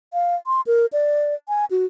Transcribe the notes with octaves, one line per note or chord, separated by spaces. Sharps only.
F5
C6
A#4
D5
G#5
F#4